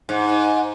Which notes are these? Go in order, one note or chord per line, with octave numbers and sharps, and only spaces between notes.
G#2